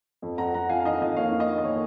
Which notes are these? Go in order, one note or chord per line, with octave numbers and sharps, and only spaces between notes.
F2
F2 F#5 A#5
F2 F#5 A#5
F2 F5 G#5
F5
D#3 D#5
F2 D#5
A#3 C#5 F5
D#3
D#5
A#3
D#5
A#3 C#5